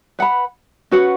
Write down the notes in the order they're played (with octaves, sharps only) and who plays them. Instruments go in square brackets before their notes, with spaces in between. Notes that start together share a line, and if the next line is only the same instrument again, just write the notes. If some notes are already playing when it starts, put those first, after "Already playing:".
[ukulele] B4 F#5 B5
C#4 F#4 B4 F#5